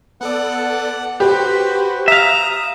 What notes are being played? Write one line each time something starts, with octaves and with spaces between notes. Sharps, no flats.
B3 A4 D5 F#5
F#4 G4 B4 C5
E5 F5 A#5 D#6